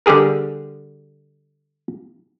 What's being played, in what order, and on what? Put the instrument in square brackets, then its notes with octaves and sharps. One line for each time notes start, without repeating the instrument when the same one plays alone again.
[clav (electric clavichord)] D3 G3 G4 G#4 A#4